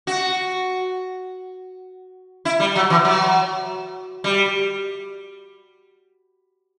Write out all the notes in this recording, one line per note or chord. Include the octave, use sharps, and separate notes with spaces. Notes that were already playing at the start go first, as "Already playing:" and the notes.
F#4
E4
G3
F#3
E3
F#3
G3